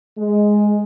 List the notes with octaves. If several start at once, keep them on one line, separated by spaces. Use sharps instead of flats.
G#3